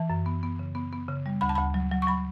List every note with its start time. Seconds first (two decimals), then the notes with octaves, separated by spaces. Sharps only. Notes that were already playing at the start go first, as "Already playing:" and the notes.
Already playing: E3 A5
0.10 F#2
0.26 B3
0.43 B3
0.59 C#3
0.75 B3
0.93 B3
1.09 C#3
1.26 G3
1.41 D2 B5
1.49 A5
1.55 D2 B5
1.74 F#3
1.92 F#3
2.02 C#6
2.07 F#3 B5